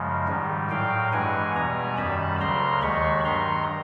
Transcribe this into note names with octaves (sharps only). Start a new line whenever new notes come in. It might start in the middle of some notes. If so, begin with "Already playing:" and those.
Already playing: F#2 C#3 F3 G#3
G#2 D#3 G3
A2 F#3 F5 G5
G2 E3 G#3 F#5 G#5
E2 B2 G3 G#5 A#5
F#2 D#3 G3 A5 B5
D2 C#3 F#3 A#5 C6
D#2 D#3 G#3 B5 C#6
G2 D#3 F#3 A#5 C6